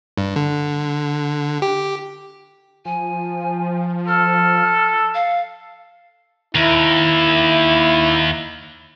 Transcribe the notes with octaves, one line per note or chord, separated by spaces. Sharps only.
G2
D3
G4
F3 G#5
A4 F6
F5
D#2 E4